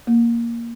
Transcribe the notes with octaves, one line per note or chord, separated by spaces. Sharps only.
A#3